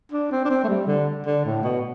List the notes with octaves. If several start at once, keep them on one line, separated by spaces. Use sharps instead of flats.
D4
C4
D4
C4
A3
G3
D3
D3
A2
B2